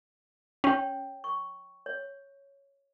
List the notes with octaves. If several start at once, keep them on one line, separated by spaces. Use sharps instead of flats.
C#4 C#5 G5
C#6
C#5